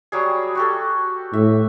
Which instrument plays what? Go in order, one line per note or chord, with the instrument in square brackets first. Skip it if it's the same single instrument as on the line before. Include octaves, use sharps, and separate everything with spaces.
[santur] F#3 G3 G#4
F#4 G4 A4
[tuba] A2 [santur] E5